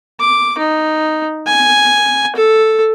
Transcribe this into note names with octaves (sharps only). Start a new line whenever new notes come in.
D6
D#4
G#5
A4